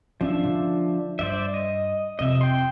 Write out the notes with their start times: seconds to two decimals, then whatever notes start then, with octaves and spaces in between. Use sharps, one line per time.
0.21 F3 C#4 D4 E5
0.43 D3
1.19 G2 C5 D5 E5
1.54 D#5
2.19 F2 C3 D#5 E5
2.41 G5 C6